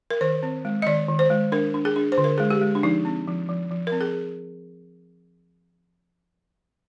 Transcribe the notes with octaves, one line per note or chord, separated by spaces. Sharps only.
A#4
D#3 C5
C4
G#3
D#5
D#3 D5
D#3
C5
G#3
D4 A#4
D4
G#4
D4
C5
D3
A#4
G#3 G#4
G4
G#3
D4
F3 D#4
C4
F3
F3
F3
C4 A#4
G#4